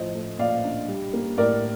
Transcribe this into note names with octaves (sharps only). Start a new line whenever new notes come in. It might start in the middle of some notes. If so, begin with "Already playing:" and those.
Already playing: A2 F3 C5 D#5
A3
A#2 D5 F5
D4
G3
A#3
A2 A#4 D5